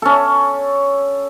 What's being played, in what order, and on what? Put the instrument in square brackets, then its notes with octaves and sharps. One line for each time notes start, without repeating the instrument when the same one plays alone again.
[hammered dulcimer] C#4 A4